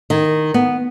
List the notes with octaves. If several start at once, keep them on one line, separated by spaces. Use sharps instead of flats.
D#3
B3